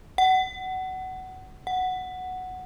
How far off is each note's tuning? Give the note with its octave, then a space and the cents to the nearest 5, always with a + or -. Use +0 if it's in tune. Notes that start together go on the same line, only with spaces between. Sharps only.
F#5 +20
F#5 +0